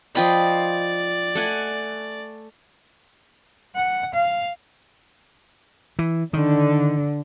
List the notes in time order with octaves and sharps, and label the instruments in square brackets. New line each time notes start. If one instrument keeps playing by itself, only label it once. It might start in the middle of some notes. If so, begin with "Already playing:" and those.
[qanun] F3 F4 B5 [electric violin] D5 [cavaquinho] D#5 G5
[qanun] A3 F#5 G#5
[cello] F#5
F5
[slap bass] E3
[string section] D3 [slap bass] D#3